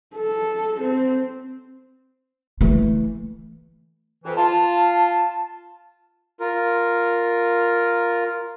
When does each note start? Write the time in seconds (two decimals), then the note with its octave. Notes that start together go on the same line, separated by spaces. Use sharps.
0.16 A4
0.81 C4
2.61 E3 A3
4.25 F2 E3
4.37 F4 A5
6.40 F4 A#4